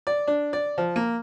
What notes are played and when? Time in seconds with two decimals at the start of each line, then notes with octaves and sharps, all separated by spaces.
0.07 D5
0.27 D4
0.53 D5
0.78 F3
0.96 A#3